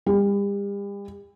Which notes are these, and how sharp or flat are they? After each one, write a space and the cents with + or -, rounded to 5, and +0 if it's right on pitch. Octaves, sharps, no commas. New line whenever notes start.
G3 +40